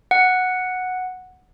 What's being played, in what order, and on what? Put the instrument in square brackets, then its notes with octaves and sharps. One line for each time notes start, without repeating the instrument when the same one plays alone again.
[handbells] F#5